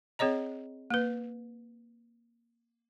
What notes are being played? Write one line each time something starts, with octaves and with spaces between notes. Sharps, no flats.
C4 G#4 C#5 D#5 A#5
A#3 B4